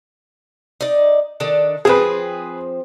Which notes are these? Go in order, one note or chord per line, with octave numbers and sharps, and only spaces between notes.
D#4 D5
D#3 D4 A4
F3 C4 G#4 B4